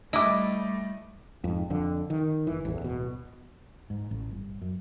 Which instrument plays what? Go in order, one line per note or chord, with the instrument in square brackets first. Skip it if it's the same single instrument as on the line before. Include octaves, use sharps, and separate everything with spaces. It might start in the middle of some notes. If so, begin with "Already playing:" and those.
[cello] G3 A3 [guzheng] E4 [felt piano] D#5 D6
[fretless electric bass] F2 G#2
F2 D3
D#3
F#1 E3
A1 E2
D1 B2
G#2
A1
G1
F#2